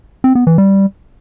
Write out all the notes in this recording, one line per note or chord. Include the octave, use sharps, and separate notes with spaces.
C4
B3
E3
G3